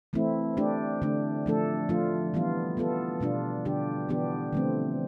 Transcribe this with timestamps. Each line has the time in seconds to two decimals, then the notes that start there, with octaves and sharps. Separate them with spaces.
0.13 E3 A3 C4 E4
0.57 A3 D4 G4
1.02 D3 A3 D4
1.46 F3 A3 D4 A4
1.89 F3 A3 D4 F4
2.34 E3 G3 B3 F4
2.77 F3 B3 F4 A4
3.20 B2 G3 D4 F4
3.65 D3 G3 D4 G4
4.09 E3 B3 D4 G4
4.53 D3 F3 A3 C4